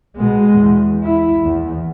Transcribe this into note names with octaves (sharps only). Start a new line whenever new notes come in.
B2 G#3
E2
E4
E2